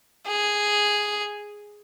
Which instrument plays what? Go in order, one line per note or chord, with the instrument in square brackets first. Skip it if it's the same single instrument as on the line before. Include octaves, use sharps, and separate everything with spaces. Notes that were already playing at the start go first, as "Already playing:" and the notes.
[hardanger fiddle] G#4